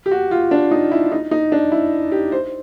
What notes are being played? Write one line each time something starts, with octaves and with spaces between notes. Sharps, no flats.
G4
F#4
F4
D4
D#4
E4
D#4
D#4
D4
E4
G4
C5